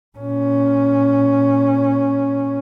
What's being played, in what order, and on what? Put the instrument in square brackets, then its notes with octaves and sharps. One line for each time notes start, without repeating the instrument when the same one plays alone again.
[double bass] A#2 C#4